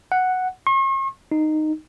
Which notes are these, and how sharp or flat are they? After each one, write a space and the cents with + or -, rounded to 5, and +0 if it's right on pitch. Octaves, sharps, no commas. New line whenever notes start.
F#5 +0
C#6 -45
D#4 -10